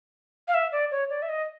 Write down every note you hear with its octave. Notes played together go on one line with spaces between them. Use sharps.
F5
E5
D5
C#5
D5
E5
D#5